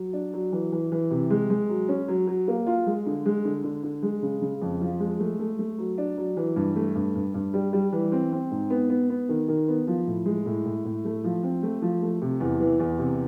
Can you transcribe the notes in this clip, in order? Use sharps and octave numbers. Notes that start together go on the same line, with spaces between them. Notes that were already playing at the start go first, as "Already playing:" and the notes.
Already playing: F#3
D4
F#3
E3
E3
E3
C3
G#3
G#3
F#3
C#4
F#3
F#3
A#3
F4
G#3
D3
G#3
D3
D3
D3
G#3
C#3
C#3
F2
F3
G#3
A3
A3
A3
F#3
D4
F#3
E3
G2
A3
G2
G2
G2
G3
G3
E3
C4
C4
G#2
B3
B3
B3
D#3
D#3
B3
F3
A2
G#3
A2
A2
A2
A3
F3
C4
A3
F3
A3
C3
E2
E3
E2
C3